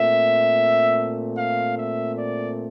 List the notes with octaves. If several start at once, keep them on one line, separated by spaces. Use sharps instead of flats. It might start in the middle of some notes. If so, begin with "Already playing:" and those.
Already playing: A#2 A3 C4 E5
F5
E5
D5